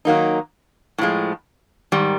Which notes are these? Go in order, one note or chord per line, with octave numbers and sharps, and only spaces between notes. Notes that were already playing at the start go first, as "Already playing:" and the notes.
D#3 F#3 A#3 D#4
A2 F3 G#3
G#2 D#3 G3